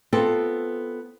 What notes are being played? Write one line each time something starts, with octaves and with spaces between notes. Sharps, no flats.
B3 C4 F4 A4